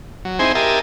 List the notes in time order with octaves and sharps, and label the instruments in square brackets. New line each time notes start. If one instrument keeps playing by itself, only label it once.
[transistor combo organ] F#3
C4 D#4 E4 G#4 C5 G#5
G4 A#4 D#5 E5 G#5 A5